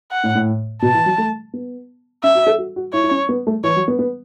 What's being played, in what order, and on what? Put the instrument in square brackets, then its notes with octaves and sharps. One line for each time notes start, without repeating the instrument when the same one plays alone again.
[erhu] F#5
[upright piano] A2
A2
[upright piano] B2 [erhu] A5
[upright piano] E3
F#3
A3
B3
[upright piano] C#4 [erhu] E5
[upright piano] F#4
A4
F#4
F#4
[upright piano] E4 [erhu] C#5
[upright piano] E4
C#4
B3
A3
[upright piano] E3 [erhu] C#5
[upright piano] F#3
B3
B3